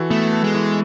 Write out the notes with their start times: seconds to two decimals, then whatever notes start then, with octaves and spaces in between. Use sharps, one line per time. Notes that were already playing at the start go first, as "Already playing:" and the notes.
Already playing: E3 F#4 A4
0.10 A3 B3
0.33 A4
0.44 G#3
0.55 E3